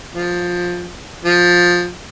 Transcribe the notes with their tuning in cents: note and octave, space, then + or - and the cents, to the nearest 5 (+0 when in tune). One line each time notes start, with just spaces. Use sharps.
F3 +15
F3 +15